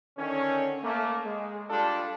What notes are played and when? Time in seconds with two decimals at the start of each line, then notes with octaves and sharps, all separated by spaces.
0.17 D3 D#3 C#4
0.83 A3 A#3
1.25 G#3
1.69 G3 D4 F4 G4 A4